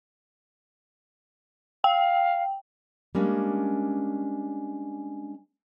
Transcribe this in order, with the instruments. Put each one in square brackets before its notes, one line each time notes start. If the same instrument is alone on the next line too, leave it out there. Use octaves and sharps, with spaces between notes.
[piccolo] F5 [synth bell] G5
[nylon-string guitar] G3 G#3 A#3 C#4 D4